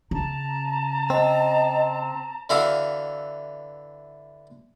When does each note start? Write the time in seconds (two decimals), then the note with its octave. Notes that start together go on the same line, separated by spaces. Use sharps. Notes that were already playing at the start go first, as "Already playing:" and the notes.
0.11 C#3 A5 A#5
1.10 C4 D#5
2.50 D3 E3 F#4 E5 F5